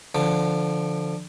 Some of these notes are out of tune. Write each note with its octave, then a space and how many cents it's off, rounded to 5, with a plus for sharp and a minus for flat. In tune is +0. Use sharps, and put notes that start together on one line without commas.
D3 +0 F3 -15